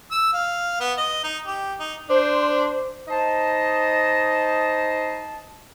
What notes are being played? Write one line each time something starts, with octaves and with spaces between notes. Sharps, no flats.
E6
F5
B3
D#5
D#4
G4
D#4
D4 C5
D#4 C5 D#5 A5